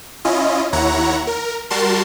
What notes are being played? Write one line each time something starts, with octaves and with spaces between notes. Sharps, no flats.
C#4 E4 F4 D#5
D#2 E4 C#5 F#5 A#5
A#4
G3 F#4 A#4 A5 C6